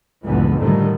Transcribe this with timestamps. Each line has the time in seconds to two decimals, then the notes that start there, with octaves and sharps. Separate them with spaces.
0.25 F#1 C#2 A2 D3 E3 B3
0.58 A2 D3 D#3 F3 G3 A3